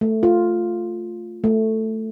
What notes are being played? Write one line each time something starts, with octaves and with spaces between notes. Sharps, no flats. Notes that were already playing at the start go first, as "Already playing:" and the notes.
A3
F4
A3